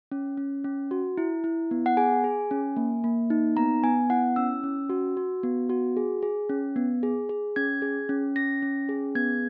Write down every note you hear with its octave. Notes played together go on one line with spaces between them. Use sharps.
C#4
C#4
C#4
F#4
E4
E4
B3
F#5
G#4 G#5
G#4
C#4
A#3
A#3
D#4
B3 A#5
B3 G#5
E4 F#5
C#4 E6
C#4
F#4
F#4
B3
F#4
G#4
G#4
C#4
B3
G#4
G#4
C#4 G#6
G#4
C#4
C#4 A#6
C#4
G#4
B3 G#6